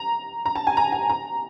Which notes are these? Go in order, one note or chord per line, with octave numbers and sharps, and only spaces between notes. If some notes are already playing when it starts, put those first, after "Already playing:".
Already playing: A#5
A#5
A5
G#5
A#5
G#5
A#5